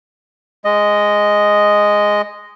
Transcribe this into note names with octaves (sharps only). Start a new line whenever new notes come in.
G#3 D#5